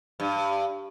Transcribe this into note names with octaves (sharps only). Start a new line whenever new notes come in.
G2